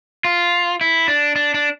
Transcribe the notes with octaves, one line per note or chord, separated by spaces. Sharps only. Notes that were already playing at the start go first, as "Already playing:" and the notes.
F4
E4
D4
D4
D4